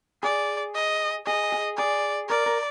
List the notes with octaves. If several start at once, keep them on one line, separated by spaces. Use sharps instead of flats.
G#4 D5
D#5
G#4 D#5
G#4
G#4 D5
A#4 D5
A#4